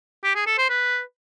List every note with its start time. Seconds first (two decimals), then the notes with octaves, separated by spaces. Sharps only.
0.24 G4
0.35 G#4
0.47 A4
0.58 C5
0.70 B4